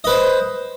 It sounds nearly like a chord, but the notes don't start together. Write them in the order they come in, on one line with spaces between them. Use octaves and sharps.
D#5 B4 C5